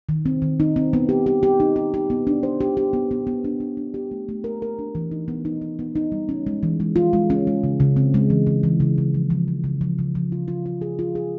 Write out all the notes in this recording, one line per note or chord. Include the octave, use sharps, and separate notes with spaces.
D#3
C4
D#3
D#4
C4
B3
G4
G4
G4
D#4
G4
G4
B3
D4
C5
G4
G4
B3
B3
B3
D4
D4
D4
G4
A3
A3
A#4
A#4
D4
E3
D#4
B3
D#4
D#4
B3
D#4
G3
C#4
G#3
E3
G#3
F4
G#3
C#4
G#3
C#3
C#3
C4
G#3
E3
C#3
E3
C#3
C#3
F3
F3
F3
C#3
F3
C#3
F3
F4
F4
F4
G#4
F4
G#4